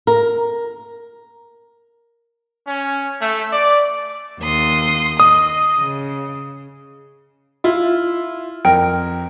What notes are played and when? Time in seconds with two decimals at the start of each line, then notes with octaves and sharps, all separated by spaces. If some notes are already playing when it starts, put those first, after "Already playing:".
0.07 A#4
2.67 C#4
3.21 A3
3.53 D5
4.42 D#2 C6 D#6
5.20 D#5 D#6
5.80 C#3
7.64 E4 F4
8.65 F2 A#4 G5